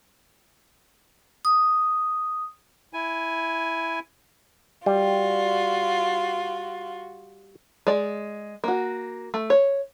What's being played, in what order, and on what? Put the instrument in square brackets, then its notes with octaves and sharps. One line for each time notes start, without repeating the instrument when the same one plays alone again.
[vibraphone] D#6
[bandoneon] E4 G#5
[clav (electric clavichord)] G3 [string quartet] F4 F#4
[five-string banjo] G#3 D5
A#3 F#4
A3
C#5